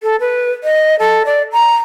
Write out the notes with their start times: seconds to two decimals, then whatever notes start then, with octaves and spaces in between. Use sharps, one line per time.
0.03 A4
0.20 B4
0.64 D#5
0.99 A4
1.26 D5
1.52 A#5